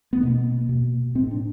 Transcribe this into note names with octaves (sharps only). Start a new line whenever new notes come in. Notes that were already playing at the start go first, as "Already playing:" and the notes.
B3
B2 A#3
B2
A2 C4
D4